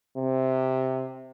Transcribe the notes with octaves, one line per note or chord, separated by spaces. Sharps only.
C3